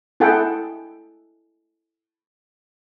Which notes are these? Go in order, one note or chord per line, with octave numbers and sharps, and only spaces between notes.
E4 G#4 A4 F#5 G5